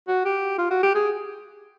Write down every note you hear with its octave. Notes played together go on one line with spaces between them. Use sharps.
F#4
G4
F4
F#4
G4
G#4